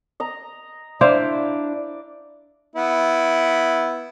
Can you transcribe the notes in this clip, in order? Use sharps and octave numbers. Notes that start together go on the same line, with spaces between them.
D#5 A#5
D4 E4 C5 D5 F5
B3 E4